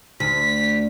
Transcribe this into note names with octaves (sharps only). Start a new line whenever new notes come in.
D2 B6